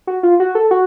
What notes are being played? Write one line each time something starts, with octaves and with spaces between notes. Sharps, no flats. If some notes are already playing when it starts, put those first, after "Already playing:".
F#4
F4
F#4
A4
F#4